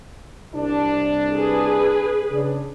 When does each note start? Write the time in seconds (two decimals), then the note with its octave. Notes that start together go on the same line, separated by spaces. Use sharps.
0.54 C2 D4
1.35 G#4 B4
2.32 C#3 D4